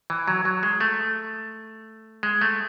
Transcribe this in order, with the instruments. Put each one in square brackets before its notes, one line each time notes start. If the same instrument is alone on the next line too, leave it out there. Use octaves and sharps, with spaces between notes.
[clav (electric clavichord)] E3
F#3
F#3
G#3
A3
G#3
A3